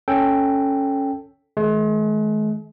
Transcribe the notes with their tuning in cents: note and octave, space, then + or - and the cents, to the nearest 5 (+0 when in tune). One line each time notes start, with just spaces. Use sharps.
C#4 +0 A4 +0 G5 +0
D#3 +25 G#3 +45